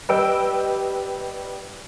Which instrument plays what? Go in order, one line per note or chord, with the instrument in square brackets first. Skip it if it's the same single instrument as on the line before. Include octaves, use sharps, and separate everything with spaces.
[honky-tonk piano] G3 B4 D#5 G5 E6 D7